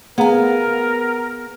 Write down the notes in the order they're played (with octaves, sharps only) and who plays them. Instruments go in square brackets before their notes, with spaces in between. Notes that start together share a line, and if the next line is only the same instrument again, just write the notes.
[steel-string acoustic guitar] B3 G#5 [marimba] G#4 F5 A#5 [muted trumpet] A#4